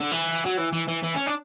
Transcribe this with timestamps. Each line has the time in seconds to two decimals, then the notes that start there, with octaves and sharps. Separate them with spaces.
0.01 D3
0.12 E3
0.45 F#3
0.58 E3
0.73 E3
0.88 E3
1.03 E3
1.15 C#4
1.26 D4